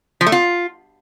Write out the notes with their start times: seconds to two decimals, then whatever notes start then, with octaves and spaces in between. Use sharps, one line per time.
0.21 F3
0.27 A3
0.32 F4